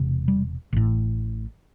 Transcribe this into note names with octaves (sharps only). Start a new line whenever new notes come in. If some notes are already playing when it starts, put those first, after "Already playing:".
Already playing: E1 C3
G3
A1 A2